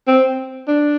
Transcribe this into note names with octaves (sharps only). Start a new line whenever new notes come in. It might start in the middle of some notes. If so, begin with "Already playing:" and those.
C4
D4